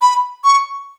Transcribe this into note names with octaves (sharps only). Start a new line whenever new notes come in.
B5
C#6